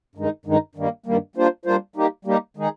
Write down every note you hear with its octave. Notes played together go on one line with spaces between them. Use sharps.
G2 D#3 G#3 D#4
G2 D#3 G#3 D#4
G2 D#3 G3 A#3
G2 D#3 G3 A#3
G3 A#3 D4 F4 C5
G3 A#3 D4 F4 C5
G3 A#3 D#4 G4
G3 A#3 D#4 G4
D#3 G#3 D#4 G#4